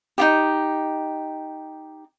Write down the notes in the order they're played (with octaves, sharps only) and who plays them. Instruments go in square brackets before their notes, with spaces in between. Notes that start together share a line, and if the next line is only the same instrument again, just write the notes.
[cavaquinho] D#4 F4 G4